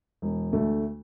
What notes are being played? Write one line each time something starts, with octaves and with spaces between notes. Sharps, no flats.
E1
D2 D3 A3